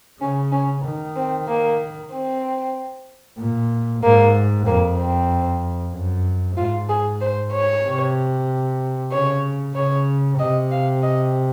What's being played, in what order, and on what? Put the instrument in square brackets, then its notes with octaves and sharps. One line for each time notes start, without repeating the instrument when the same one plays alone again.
[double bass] C#3 [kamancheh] C#4
[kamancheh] C#4
[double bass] D#3
[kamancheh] C4
A#3
C4
[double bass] A#2
[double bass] G#2 [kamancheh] A#3
[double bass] F2 [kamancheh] A#3
[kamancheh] C4
[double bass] F#2
[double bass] G#2 [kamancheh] F4
[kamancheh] G#4
C5
C#5
[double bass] C3
[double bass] C#3 [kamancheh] C#5
[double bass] C#3 [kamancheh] C#5
[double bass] C3 [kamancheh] D#5
[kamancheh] F5
D#5